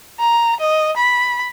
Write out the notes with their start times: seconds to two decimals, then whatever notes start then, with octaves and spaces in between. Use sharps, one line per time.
0.20 A#5
0.60 D#5
0.97 B5